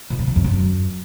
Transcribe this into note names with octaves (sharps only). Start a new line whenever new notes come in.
A#2
C#3
F3
F2
F#2